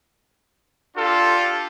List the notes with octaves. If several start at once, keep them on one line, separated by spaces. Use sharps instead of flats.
D4 F4 G4 A4